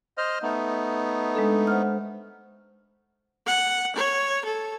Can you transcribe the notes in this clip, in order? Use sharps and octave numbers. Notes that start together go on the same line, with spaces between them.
C5 D#5 F6
A3 B3 D#4
G#3 D4 A4
C5 F#5 F6
F#5
C#5
A4